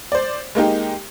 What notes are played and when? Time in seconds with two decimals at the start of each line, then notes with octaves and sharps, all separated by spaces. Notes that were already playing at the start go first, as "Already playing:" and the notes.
0.12 C5 D5
0.55 G#3 A#3 D#4 G4